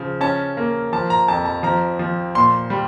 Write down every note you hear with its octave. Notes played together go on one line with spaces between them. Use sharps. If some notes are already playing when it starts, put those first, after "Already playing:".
Already playing: C#3 F3
C#4 A5
A#3
F3 A5
A#5
F2 A5
A5
F3 A#5
F3
A#2 C6
G3